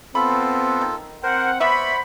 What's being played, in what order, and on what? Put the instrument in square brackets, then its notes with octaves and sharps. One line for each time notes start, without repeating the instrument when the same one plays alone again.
[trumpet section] B3 C4 [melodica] F4 A4 [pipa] B5
[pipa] D#3
[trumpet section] C4 F#5 [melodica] A#4 C5
[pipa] B3 B4 E5 [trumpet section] C5 F#5 B5 [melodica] D5 C#6